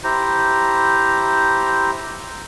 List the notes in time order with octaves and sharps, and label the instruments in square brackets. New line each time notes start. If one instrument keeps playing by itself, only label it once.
[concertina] E4 G4 C5 A#5